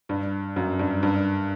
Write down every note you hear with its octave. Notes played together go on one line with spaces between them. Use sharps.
G2
F#2
G2
G2